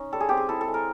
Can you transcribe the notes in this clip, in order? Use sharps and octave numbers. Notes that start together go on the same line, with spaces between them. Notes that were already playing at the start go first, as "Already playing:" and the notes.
Already playing: C#4 D#4
G3 A4
G#4
C4 G4
G#4
E4 A4
A4
G#3
A#4